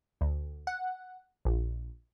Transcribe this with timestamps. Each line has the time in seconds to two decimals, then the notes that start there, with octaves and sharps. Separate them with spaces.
0.21 D2
0.67 F#5
1.45 A#1